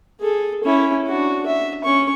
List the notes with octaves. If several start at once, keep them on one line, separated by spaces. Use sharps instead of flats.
G#4 A4
C#4 E4
D4 F#4
E5
C#4 C#6